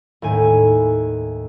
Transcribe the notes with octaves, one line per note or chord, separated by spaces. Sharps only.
D#2 A2 G#5